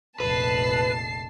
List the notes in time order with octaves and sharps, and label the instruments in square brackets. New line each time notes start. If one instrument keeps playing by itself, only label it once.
[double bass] F1 A#1 [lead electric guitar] B4 [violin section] A5 C7